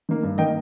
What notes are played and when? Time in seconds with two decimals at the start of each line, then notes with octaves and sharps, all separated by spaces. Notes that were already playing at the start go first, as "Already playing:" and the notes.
0.09 D#3 A#3
0.23 G2
0.38 D#3 A#3 D#5 G5